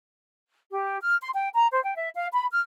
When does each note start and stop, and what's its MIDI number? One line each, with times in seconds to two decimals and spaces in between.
0.72 0.97 67
1.02 1.15 89
1.21 1.29 84
1.34 1.48 79
1.55 1.67 82
1.71 1.82 72
1.84 1.93 79
1.96 2.09 76
2.15 2.26 77
2.32 2.46 83
2.51 2.60 89